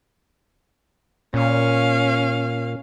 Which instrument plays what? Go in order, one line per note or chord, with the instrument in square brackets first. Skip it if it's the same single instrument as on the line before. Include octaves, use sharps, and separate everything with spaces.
[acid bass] A#2 [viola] C#4 F5